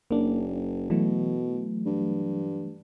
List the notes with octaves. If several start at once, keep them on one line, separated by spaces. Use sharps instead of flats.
F#1 A#3 D4
B2 E3 F#3 A3
G2